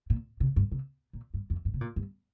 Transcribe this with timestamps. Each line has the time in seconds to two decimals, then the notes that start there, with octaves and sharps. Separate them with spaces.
0.10 A#2
0.40 C3
0.56 G2
0.72 C3
1.13 A#2
1.34 G2
1.50 F2
1.65 G2
1.74 C3
1.81 A#2
1.96 G2